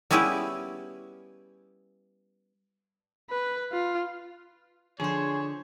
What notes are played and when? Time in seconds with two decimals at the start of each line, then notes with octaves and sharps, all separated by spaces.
0.11 G3 B3 C#4 E4 G4 G#4
3.30 B4
3.72 F4
5.00 D3 F3 G#4 C5 C#5